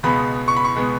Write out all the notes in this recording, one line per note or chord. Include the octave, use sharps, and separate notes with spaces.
C#2 B2 G#3 B3 B5
C#6
B5
C#6
B2 G#3 B3